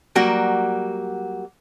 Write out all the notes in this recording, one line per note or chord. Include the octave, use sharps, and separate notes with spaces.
F#3 G3 A#3 F#4